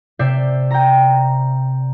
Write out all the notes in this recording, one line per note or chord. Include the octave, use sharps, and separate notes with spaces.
C3 D5 E5 E6 G6 C7
G5 A#5